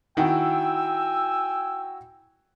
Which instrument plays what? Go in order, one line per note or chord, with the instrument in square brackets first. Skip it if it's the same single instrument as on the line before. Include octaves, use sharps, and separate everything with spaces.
[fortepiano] D#3 [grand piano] E4 F#4 [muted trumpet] G5 [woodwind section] G#5 E6